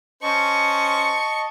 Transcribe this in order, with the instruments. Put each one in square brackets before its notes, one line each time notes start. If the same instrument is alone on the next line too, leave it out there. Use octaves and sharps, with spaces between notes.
[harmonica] C#4 C5 [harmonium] D#5 A5 [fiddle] C#6